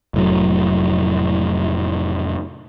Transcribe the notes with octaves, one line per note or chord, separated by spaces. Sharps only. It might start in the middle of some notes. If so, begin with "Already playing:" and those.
F1 A2 F#3